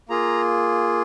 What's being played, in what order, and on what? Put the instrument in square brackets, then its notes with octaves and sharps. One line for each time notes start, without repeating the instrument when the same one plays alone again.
[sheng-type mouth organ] A#3 F4 G#4 A#5